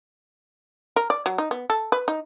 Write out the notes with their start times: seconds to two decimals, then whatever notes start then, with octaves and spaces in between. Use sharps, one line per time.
0.96 A#4
1.10 D5
1.26 F#3
1.38 D#4
1.51 B3
1.70 A4
1.92 B4
2.08 D#4